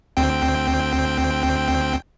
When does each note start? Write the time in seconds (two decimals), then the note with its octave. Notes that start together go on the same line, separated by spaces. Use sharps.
0.17 D2 C4 G5